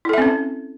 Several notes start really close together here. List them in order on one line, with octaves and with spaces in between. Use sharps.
E4 A4 E5 C4 C#4